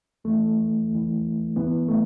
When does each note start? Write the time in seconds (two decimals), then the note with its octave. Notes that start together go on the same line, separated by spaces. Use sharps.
0.24 E2 E3 A3
0.90 E2
0.95 E3
1.56 G2 E3 B3
1.88 A3